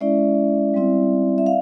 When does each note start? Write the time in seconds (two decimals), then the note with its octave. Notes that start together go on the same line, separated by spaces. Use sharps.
0.01 G#3 C#4 E4 D5 E5
0.74 G3 C4 E4
1.38 E5
1.46 F5